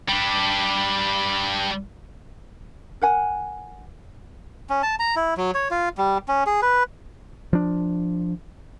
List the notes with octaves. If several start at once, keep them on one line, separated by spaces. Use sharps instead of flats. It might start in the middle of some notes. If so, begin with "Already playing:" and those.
G3 D4
A#4 F#5 G#5
C#4
A5
A#5
E4
F#3
C#5
F4
G3
C#4
G#4
B4
F3 D4